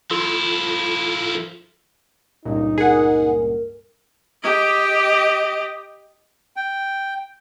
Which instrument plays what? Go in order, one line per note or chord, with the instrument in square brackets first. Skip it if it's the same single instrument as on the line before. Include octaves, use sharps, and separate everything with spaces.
[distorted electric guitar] F3 E4 [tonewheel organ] F4 A4
[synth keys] C#2 G2 A#2 [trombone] D#4
[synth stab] G#4 F#5 [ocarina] A#4
[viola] G4 D#5
[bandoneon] G5